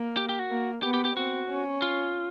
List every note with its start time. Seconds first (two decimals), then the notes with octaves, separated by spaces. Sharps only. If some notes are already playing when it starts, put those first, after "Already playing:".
Already playing: A#3
0.17 G4
0.29 G4
0.39 F#4
0.51 A#3
0.83 B3 G4
0.94 G4
1.05 G4
1.16 C4 F#4
1.50 C#4
1.82 F4